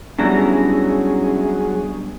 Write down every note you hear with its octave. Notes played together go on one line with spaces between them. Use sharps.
F#3 G3 B3 C#4 D4 E4 G#4 A#5